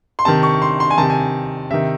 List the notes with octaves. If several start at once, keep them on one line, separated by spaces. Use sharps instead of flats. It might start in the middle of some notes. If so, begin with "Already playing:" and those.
C6
C3 D#3 A5
C#6
C6
C6
G#5
C3 D#3 A5
G#5
C3 D#3 E5